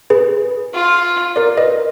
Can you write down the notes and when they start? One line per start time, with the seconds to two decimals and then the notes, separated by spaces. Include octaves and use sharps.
0.10 G#4 B4
0.73 F4
1.36 A#4 D5
1.57 B4 D#5